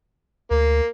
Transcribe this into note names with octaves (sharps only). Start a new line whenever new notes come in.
D2 A#3